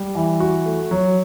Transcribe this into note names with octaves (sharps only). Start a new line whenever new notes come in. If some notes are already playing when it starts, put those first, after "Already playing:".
Already playing: G3
E3
F#4
A3
F#3